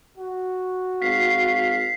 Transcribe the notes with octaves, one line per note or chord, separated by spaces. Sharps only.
F#4
G#1 F5 B6 C7